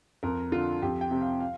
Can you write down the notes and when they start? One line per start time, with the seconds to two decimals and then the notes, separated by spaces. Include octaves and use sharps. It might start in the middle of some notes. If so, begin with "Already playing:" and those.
0.23 F2 A#4
0.52 D3 F4
0.82 F2 G4
1.01 G5
1.11 C3
1.21 F5
1.40 F5